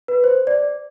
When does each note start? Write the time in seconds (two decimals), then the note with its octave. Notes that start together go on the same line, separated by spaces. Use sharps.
0.08 B4
0.24 C5
0.47 D5